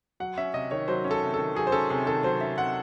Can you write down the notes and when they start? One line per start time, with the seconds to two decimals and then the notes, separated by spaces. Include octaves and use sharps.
0.20 F#3 F#5
0.37 C#4 E5
0.54 C3 D#5
0.71 D#3 C#5
0.88 F#3 C5
1.04 C#4
1.11 A4
1.22 C3
1.34 A4
1.39 D#3
1.55 F#3 G#4
1.67 C5
1.72 C#4 A4
1.90 C3 G#4
2.06 D#3 A4
2.23 F#3 C5
2.41 C#4 E5
2.57 C3 F#5